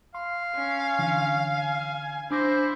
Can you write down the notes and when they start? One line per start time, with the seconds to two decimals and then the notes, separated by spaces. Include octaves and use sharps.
0.15 F5 C6
0.54 C#4
0.99 D3 E3
1.57 G#5
2.31 D4 E4 C5 D6 A#6